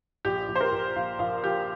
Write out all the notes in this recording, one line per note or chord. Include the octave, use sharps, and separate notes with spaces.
A#1 G4
A#1
C5
A#4
A#1
A#1 F5
A#1 F5
F3 G4